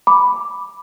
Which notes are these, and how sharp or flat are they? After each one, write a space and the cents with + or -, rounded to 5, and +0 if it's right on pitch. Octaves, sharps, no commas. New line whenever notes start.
B5 +0 D6 +0